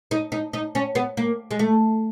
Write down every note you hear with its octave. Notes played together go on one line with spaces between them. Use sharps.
D#4
D#4
D#4
C#4
B3
A#3
G#3
A3